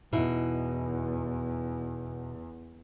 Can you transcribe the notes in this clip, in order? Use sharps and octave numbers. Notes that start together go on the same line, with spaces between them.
E2 B2 D#4 E4